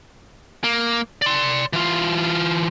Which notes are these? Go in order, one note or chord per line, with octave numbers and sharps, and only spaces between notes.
A#3
D5 C6
E3 F4